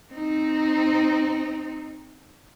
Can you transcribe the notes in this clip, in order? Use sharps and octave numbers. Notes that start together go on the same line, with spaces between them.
C4 D#4